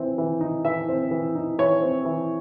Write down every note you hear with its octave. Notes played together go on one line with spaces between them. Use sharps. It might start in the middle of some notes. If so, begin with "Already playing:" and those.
Already playing: E3 C4
E3
D#4
E3 E5
C4
E3
D#4
E3 C#5
C4
E3